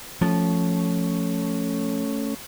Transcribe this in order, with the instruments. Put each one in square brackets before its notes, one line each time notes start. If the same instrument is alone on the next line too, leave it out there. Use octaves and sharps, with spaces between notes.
[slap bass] F3 [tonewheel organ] A3 C#4